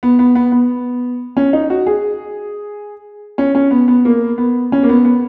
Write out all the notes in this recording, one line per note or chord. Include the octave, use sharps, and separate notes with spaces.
B3
B3
B3
B3
C#4
D#4
F#4
G#4
C#4
C#4
B3
B3
A#3
B3
C#4
A#3
B3
B3